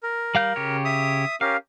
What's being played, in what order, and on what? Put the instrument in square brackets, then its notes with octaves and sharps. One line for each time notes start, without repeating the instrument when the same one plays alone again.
[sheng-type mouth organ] A#4
[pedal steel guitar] G3 F5 G6
C#3 G4 C#5
[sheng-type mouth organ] E5 D#6
[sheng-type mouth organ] C#4 G4 A#4 [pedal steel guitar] F5